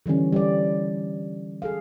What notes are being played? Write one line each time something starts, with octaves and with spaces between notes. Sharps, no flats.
D3 E3 G3 C#4
G3 D5
G#4 A4 F5